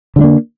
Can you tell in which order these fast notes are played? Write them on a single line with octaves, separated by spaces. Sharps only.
D3 G#3 D4 A#3